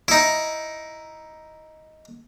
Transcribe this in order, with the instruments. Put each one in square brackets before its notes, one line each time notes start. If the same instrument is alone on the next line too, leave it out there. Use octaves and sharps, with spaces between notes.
[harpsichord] D#4 E4